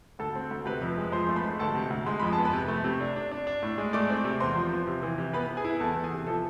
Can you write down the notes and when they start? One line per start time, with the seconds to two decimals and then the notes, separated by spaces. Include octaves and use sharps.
0.19 D2 A4 A5
0.35 C4
0.51 D2
0.66 C3 B4 B5
0.82 F2
0.98 G#3
1.12 F3 C5 C6
1.26 A3 C6
1.36 B4 B5
1.44 G#2
1.59 D2 A4 A5
1.75 C3
1.90 D2
2.06 G#3 C6
2.20 F2 B5
2.33 A5
2.38 B3
2.45 B4 B5
2.53 C3
2.68 A3
2.84 C3
3.01 D4
3.16 D4
3.31 D4
3.47 D4
3.63 A2
3.78 G#3
3.93 A3 D5 D6
4.10 C4
4.24 C3
4.40 E2 C5 C6
4.55 F3
4.72 F3
4.87 C3
5.03 E3
5.18 C3
5.33 B3 B4 B5
5.49 B3
5.57 G#4 G#5
5.64 E4
5.80 E2 A4 A5
5.96 E2
6.04 G#4 G#5
6.12 C3
6.27 F3 A4 A5